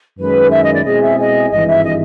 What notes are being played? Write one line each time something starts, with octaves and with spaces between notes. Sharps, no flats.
F#2 D#3 G#3 C#4 B4
E5
D#5
D5
B2 G#3 C4 E4 G#4 D#5
E5
D#5
G#1 G2 E3 G#3 D#5
E5
D#5